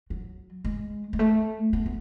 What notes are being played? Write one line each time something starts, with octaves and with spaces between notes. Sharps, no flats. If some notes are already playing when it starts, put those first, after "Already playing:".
F#3
G#3
G#3
A3
B3
B3